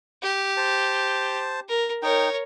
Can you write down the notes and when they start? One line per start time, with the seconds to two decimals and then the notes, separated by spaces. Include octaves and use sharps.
0.22 G4
0.57 C5 A5
1.68 A#4
2.02 D#4 A#4 C#5 G5